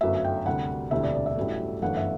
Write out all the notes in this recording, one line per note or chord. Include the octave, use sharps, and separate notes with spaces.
G1 F#2 F#3 A3 E5
G5
D2 C3 G3 F#5
E1 D2 C3 G3 E5
D5
D5
E5
A1 G2 F#3 A3
G1 F#2 E3 A3 F#5
E5